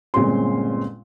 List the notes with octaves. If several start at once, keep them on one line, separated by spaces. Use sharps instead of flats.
G1 A#2 G#3 C4 C#4 C6